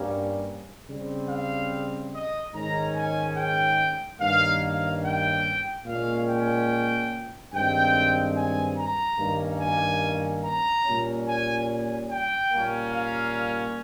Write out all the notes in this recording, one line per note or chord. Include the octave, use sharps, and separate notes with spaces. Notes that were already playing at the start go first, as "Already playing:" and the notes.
Already playing: G2 G3 A#3 C#4
C#3 G3 C4
F5
D#5
G#2 D#3 G#3 C#4 A#5
G#5
G5
G2 D#3 A#3 C#4 F5
F5
G5
A#2 G#3 C#4 F5
G5
G2 D#3 G#3 C4 G5
G#5
A#5
G2 D#3 A#3 C#4
G#5
A#5
A#2 G3 C#4
G#5
G#5
G5
A#2 G3 A#3 C#4
F5